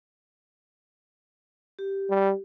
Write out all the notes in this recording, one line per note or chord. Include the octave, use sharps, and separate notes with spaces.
G4
G3